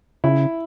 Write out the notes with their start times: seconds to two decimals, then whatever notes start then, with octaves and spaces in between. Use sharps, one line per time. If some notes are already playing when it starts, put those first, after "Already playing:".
0.24 C#3 E4